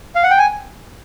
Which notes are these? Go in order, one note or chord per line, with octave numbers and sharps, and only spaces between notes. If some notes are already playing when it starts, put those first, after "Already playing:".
F5
F#5
G5
G#5